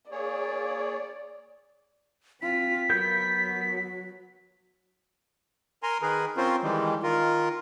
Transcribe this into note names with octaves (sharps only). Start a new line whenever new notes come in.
A#3 G#4 C#5 D5
C4 F4 B6
F#3 B3 A#4 G6
A#4 G#5 A#5 C6
D#3 G#4 A#4 B4
C4 C#4 F4 A#4 C5
D#3 E3 G3 G#3
D#3 F4 A#4